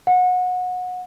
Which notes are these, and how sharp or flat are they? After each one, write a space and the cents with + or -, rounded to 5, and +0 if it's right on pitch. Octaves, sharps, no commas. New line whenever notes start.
F#5 -25